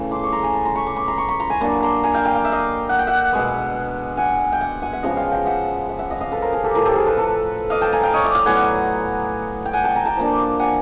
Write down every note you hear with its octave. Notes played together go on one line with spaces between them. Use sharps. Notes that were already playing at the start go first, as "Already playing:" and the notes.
Already playing: C#3 E3 A3
C6 D6
C#6
A#5 C6
G#5 A#5
A5 B5
A#5 C6
B5 C#6
C6 D6
B5 C#6
A#5 C6
B5 C#6
B5 C#6
A#5 C6
G#5 A#5
F#3 A#3 D4 A5 B5
A#5 C6
G#5 A#5
F5 G5
F5 G5
F5
E5
D#5 F5
F#5
G5
E5 F#5
B2 G#3 B3
F#5 G#5
G5
F#5 G#5
F#5 G#5
E5 F#5
C#3 F3 G#3 B3 D#5 F5
F5 G5
F5 G5
E5 F#5
E5 F#5
E5 F#5
D#5 F5
D#5 F5
A4 B4
A#4 C5
G#4 A#4
G4 A4
A2 F3 A3 A#4
G4 A4
G#4 A#4
A4 B4
A4 B4
D#5 F5
G5 A5
G#5 A#5
F5 G5
C#5 D#5
D5 E5
D#5 F5
A2 F#3 B3 F#5 G#5
G5
F#5 G#5
G5 A5
G#5 A#5
G5 A5
F3 A#3 D4
F#5 G#5